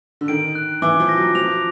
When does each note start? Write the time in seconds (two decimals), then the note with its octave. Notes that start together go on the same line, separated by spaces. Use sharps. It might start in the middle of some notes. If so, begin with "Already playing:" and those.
0.21 D3
0.28 D#3 D7
0.55 F#6
0.82 E3 D6
1.00 F3
1.09 A#6
1.17 F#3
1.35 F3 F7